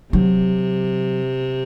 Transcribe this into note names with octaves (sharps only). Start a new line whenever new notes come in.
C3 F#3